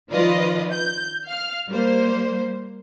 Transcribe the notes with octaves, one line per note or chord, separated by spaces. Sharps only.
D#3 F3 F4 B4 D5 D#5
G6
F5 F6
G3 A#3 C5